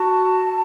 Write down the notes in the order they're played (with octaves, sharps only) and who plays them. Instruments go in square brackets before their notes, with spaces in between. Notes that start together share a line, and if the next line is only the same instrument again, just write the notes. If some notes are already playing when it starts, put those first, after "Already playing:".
Already playing: [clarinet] F#4 [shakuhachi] A5